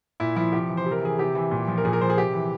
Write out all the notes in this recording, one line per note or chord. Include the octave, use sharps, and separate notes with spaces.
A#2 E4
F3 E4
C3 G4
E3
C5
C3
A#4
E3 G#4
C3 G4
E3
A#2
F3
A#4
A#2 G#4
A#4
F3 C5
G#4
C3 G4
E3